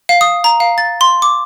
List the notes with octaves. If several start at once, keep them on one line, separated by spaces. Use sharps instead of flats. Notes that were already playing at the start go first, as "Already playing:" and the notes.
F5
D#6
A#5
F5
A6
C6
D6